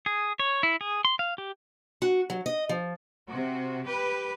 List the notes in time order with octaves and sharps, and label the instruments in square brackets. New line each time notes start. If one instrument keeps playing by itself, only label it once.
[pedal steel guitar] G#4
C#5
E4
G#4
C6
F5
G4
[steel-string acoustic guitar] F#4
F#3
D#5
F3
[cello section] C3 F#4
G4 B4